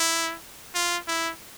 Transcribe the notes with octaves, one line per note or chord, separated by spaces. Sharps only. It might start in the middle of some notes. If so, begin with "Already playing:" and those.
Already playing: E4
F4
E4